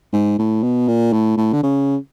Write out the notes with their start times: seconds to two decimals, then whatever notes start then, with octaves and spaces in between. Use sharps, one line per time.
0.13 G#2
0.39 A2
0.63 B2
0.88 A#2
1.13 A2
1.37 A2
1.53 D3
1.63 C#3